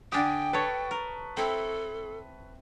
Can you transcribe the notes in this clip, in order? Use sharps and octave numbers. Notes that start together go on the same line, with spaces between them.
D3 D4 G4 G5 G#5 D6 D#6
A4 B4 C#5 A5 C#6
A#4
C4 E4 A4